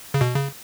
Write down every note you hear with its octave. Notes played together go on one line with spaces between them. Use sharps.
C#3
B2
C#3